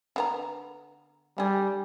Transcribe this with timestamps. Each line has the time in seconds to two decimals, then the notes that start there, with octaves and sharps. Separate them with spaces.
0.16 D3 B3 A#5
1.38 D3 G3 G#4